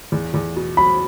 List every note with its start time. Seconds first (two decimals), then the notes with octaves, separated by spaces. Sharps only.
0.12 E2
0.34 E2
0.56 B2
0.77 F#3 B5